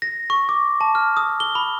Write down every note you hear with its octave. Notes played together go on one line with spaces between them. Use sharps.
A#6
C#6
D6
A5
F6
D#6
G7
B5